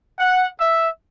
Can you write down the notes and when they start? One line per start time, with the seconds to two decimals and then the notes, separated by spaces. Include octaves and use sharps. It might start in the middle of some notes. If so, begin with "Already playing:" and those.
0.19 F#5
0.60 E5